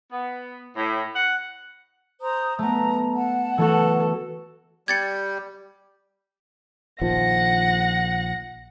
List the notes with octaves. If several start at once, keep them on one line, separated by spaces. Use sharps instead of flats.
B3
A2
F#5
C5 A#5 D#6
A3 B3 A#5
F#5 A5
E3 A3 F#4 A4
G3 G4 G#6 A6 C#7
A#1 D#3 F3 F#5 A#6